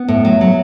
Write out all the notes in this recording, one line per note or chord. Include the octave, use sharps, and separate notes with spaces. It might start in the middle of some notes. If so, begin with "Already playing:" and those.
Already playing: B3
A2
F#3
F#3